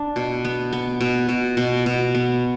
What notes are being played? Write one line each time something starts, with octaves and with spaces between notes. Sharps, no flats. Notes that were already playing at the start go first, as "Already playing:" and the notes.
Already playing: D4
B2
B3
B3
B2
B2
B2
B2
B3